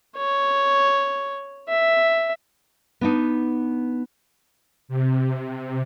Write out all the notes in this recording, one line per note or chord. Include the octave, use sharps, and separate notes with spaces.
C#5
E5
B3 D4 D#4
C3